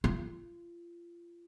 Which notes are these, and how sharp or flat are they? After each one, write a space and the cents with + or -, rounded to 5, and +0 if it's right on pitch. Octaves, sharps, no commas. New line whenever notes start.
F4 -30